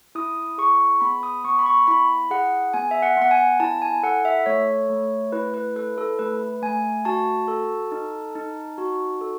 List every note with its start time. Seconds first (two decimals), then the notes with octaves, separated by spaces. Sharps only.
0.15 E4 D#6
0.58 G#4 C#6
1.01 B3 B5
1.23 D#6
1.44 B3 C#6
1.59 B5
1.66 C#6
1.87 E4 B5
2.31 G#4 F#5
2.74 B3 G#5
2.91 E5
3.02 F#5
3.17 B3 F#5
3.31 G#5
3.60 E4 A5
3.82 G#5
4.03 A4 F#5
4.25 E5
4.46 A3 C#5
4.89 A3
5.32 E4 B4
5.54 B4
5.76 A4 B4
5.98 A4
6.19 A3 B4
6.62 A3 G#5
7.05 F#4 A5
7.48 A4
7.92 D#4
8.35 D#4
8.78 F#4
9.21 A4